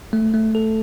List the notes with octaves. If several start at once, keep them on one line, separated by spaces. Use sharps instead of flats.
A3
A3
A4